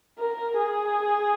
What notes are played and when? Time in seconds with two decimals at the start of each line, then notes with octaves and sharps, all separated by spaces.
0.19 A#4
0.58 G#4